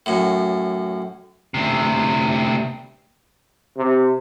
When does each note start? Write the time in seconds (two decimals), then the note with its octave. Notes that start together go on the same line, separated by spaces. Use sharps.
0.06 F#2 A2
1.54 D2 C3
3.77 C3